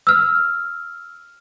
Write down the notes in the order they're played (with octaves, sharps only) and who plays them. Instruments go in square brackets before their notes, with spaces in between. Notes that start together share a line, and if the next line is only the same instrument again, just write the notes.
[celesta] E6 F6